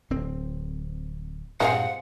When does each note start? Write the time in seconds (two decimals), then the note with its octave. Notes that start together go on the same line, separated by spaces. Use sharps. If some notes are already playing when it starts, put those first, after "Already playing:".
0.10 D1 C4
1.60 G2 A#2 G#3 C4 F5 F#5